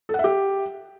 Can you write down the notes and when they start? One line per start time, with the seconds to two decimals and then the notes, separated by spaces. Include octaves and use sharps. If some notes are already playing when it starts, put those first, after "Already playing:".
0.09 A4
0.14 F#5
0.19 E5
0.24 G4